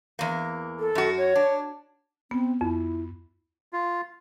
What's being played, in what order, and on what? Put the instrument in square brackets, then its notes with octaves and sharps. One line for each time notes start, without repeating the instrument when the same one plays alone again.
[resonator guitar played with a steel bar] E2 A#3
[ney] A4
[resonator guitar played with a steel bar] F#2 F#4
[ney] C#5
[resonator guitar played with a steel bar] D4
[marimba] B3 [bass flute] C4
[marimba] F2 [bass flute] E4
[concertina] F4